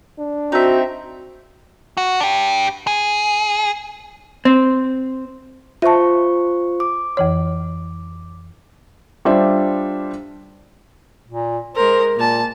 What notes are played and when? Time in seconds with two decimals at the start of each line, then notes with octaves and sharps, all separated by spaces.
0.19 D4
0.52 C4 D#4 F#4 E5
1.97 F#4
2.20 D4 G4
2.87 G#4
4.45 C4
5.82 F4 C5 E5 A5 C#6
6.80 D6
7.17 F2 E3 C#5
9.25 G3 D4 F4 C5 D5 E5
11.28 A#2
11.76 G#3 A#4 C5
12.16 A#2 A#3 A5